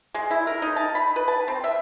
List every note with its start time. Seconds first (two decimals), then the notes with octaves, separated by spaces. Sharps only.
0.15 G#3
0.31 E4
0.47 A#4
0.62 D#4
0.76 A5
0.95 B5
1.16 B4
1.28 A5
1.48 C4
1.64 E5